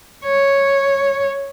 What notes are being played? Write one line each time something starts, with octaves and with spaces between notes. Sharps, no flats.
C#5